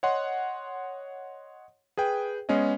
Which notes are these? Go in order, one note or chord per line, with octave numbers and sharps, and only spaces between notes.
C#5 D#5 F#5 C6
G#4 B4 G5
G#3 B3 C#4 G#4 D#5